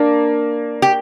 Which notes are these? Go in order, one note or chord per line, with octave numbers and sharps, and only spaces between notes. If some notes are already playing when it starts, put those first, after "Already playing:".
Already playing: A#3 D4
G4